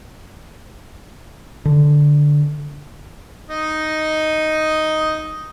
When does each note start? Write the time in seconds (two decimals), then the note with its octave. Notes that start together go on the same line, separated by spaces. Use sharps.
1.65 D3
3.49 D#4 D#5